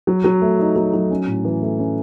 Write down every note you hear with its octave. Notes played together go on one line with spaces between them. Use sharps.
F#3
F#3
A3
D#4
F#3
F#3
C#4
A2
E3
A3
C#4